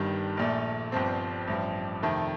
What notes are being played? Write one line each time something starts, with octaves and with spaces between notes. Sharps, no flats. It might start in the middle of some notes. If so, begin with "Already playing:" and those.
Already playing: G1 G2 D#3 G3
A#1 A#2 A3
G1 G2 F3 C4
A1 G2 F3
F2 C3 D#3 A3